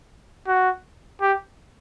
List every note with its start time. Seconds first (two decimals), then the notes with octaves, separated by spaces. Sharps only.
0.47 F#4
1.21 G4